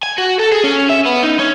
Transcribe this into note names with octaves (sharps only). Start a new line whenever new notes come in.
G#5
F#4
A4
G#4
C#4
E5
B3
D#4
C#4